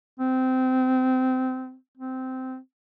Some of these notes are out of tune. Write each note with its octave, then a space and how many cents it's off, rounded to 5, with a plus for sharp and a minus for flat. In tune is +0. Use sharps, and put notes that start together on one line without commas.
C4 -20
C4 -15